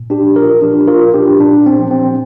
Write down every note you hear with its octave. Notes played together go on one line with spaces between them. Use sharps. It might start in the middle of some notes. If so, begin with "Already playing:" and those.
Already playing: A#2
D4 G4
F3
F4 A#4
F3 D4 G4
F4 A#4
A#2
D4 G4
A#2 D4
C4
F3
C4